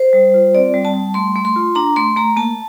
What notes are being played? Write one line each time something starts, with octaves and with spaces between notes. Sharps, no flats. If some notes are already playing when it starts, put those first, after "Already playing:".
Already playing: C5
G3
F4
C4 D5
G3
A5
G3
A3 C6
A3
C6
F4
D4 A#5
A3 C6
A3 A#5
A#3 A5